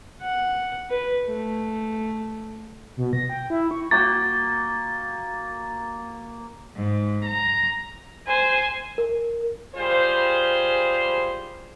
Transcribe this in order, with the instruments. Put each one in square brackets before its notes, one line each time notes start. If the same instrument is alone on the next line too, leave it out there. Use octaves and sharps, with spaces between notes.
[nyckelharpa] F#5
B4
A3
[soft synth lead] B2
A#6
G5
E4
C#6
[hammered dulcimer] A#3 F#4 G5 [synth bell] A6
[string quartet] G#2
A#5
[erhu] C5 [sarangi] G#5
[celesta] A#4
[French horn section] G3 F4 G#4 C5